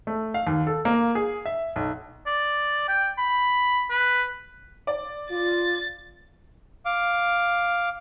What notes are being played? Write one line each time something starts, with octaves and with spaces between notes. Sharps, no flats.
A3
F5
D#2
A4
A#3
G#4
E5
B1
D5
G5
B5
B4
D5
F4 A6
F5 D6